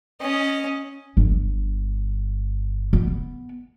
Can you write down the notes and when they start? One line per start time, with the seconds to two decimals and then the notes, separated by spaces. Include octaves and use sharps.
0.20 C#4 D#5
1.17 G1
2.93 B3